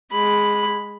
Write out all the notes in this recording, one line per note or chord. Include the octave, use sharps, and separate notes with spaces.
G#3 B5